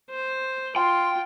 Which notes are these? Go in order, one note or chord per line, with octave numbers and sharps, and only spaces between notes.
C5
F4 G5 C6